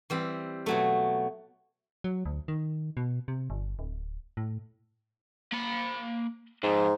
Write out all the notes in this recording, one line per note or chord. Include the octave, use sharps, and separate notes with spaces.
E3 G3 C4
B2 F#3 A3
F#3
D2
D#3
B2
C3
G1
D1
A2
A#3 B5
F2 G#2